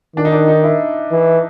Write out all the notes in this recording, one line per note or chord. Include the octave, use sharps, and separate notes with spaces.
D#3 D4
D#4
D4
D#4
E4
E3